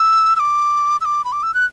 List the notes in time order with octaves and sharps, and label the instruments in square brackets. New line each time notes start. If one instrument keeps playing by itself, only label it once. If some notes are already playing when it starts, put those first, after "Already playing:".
Already playing: [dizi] E6
E6
D6
E6
D6
B5
D6
E6
F#6